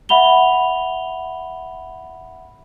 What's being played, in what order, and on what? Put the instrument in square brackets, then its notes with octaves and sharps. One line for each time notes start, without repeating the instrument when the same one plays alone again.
[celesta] E5 F#5 B5 F7 G7